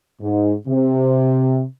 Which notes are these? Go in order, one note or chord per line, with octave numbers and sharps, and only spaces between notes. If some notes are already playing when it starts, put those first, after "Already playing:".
G#2
C3